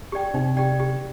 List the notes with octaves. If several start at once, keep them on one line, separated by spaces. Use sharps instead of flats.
G4 D5 G5
C3 D#4
G4 D5 G5
G4